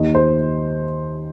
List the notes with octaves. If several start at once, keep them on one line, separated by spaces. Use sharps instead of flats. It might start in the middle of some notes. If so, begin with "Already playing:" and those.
Already playing: D#2 D#3 D#5
C5